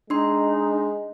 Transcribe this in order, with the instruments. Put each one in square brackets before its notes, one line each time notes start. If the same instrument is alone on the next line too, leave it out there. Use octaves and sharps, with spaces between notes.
[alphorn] G#3 [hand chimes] D4 C6 [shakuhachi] D#4